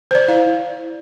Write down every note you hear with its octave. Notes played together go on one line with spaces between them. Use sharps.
C5 D5
E4 F5